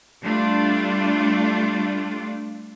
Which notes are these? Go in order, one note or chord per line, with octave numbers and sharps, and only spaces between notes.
G3 A3 D4 F4 D5